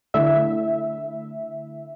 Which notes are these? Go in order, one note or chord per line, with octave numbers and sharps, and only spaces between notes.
D3 A3 E4 E5